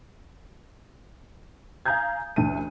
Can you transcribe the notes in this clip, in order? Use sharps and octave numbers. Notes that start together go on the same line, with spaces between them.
F5 G#5 A#5 D#6 G6 G#6
A1 D2 A3 A5 D#7